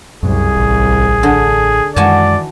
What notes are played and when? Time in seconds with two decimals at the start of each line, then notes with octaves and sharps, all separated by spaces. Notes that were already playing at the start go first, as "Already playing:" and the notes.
0.23 C2 F#2 G#4
0.57 A1
1.23 D3
1.96 F#2 D#3 E3 G#3 F#4 D5 G#5 A5